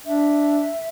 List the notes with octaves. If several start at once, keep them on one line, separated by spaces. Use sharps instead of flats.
D4 E5